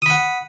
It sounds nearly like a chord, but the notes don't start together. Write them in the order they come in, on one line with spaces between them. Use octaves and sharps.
D#6 B5 F#5